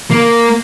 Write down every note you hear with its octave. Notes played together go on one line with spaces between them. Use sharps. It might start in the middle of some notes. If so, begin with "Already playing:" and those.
A#3